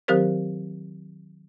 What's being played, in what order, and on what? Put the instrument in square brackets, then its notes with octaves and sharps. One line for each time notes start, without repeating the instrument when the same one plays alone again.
[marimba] D#3 F#3 C4 G4 A#4 C5